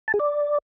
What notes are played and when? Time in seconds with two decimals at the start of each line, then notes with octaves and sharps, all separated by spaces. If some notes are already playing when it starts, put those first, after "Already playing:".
0.08 A5
0.14 G#4
0.20 D5